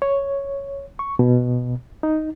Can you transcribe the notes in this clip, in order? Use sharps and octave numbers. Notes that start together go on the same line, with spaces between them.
C#5
C#6
B2
D#4